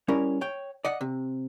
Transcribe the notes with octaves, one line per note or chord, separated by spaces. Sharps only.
G3 C#4 E4 A#4 C#5
C#5 G5
D5 D#5 F#5
C3